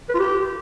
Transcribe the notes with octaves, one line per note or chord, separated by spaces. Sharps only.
B4
F4
G4